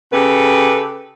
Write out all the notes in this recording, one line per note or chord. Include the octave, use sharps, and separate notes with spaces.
C#3 G4 A4 B4